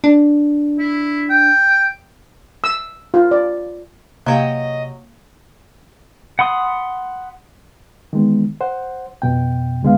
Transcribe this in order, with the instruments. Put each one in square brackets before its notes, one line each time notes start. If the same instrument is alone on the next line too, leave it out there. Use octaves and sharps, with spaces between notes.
[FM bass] D4
[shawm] E4
G5
[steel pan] E6
F4
D5
[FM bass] C3 [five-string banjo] F#3 C#5 G5 [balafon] A#3 F5 [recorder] D#5
[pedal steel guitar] F#5 B5 C6 D#6
[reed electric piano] D#3 E3 G#3 B3
C5 F#5
F2 B2 G5
C#2 D3 G#3 B3 F5